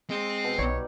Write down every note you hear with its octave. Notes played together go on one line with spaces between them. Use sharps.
G#3 C4
B2
B1 G3 D#4 C#5 D5